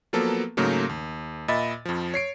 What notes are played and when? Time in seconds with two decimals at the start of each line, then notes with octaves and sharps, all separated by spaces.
0.13 F3 F#3 A#3 B3 A4
0.57 G#2 C#3 F#3 A3 A#3
0.89 D#2
1.48 A#2 D#5 E5 B5 A6
1.85 F2 F3
2.14 C#5 C7 D7